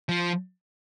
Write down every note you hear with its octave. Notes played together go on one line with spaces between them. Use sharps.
F3